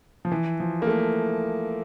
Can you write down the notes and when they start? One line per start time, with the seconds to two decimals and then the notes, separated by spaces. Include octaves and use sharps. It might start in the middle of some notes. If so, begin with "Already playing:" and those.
0.25 F3
0.32 E3
0.60 F3
0.82 A#3
0.87 A3